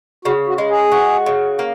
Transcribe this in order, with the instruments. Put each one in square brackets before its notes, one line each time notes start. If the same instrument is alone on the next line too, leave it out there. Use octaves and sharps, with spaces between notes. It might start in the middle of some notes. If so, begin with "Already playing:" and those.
[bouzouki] C#3 [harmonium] F#4
[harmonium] F#4
[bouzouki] G#3
[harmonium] G#4
[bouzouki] F#4
C#3
A#3